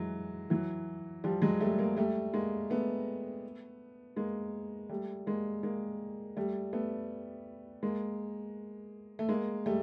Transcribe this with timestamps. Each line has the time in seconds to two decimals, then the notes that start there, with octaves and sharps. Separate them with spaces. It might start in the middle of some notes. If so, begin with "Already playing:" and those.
Already playing: E3 F#3 G#3
0.50 E3 F#3
1.24 F3 G3
1.42 F#3 G#3
1.61 G3 A3
1.79 G#3 A#3
1.97 G3 A3
2.33 G#3 A#3
2.70 A3 B3
4.16 G#3 A#3
4.89 G3 A3
5.27 G#3 A#3
5.63 G#3 A#3
6.36 G3 A3
6.73 A3 B3
7.83 G#3 A#3
9.19 A3
9.29 G#3 A#3
9.66 G3 A3